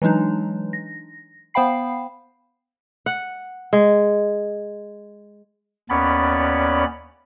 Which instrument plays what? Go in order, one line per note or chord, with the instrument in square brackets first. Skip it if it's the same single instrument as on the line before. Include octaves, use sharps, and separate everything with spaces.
[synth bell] E3 F#3 G#3 D4 D#4
A#6
B3 C5 F5 G5 B5 C7
[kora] F#5
G#3
[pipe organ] D#2 B3 C#4 C#5 D5 B5